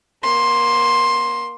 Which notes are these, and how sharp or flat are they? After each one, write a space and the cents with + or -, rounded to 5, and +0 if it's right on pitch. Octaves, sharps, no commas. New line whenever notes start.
A#3 +30 C6 +10